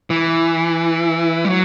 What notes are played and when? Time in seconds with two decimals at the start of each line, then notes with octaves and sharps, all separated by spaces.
0.10 E3
1.45 G3
1.49 F#3